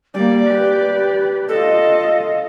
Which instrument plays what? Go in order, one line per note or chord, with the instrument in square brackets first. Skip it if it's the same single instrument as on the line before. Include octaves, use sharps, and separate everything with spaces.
[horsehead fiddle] G3 A#3 [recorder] D5
[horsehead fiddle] G4 B4
[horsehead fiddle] F4 D#5 [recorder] A4